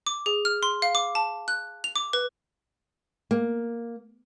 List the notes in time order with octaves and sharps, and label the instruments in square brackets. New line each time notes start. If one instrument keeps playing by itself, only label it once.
[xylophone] D6
G#4
F6
C6
F5
D6
A5
F#6
F7
D6
B4
[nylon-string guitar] A#3